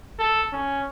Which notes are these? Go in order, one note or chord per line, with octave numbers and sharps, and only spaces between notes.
A4
C#4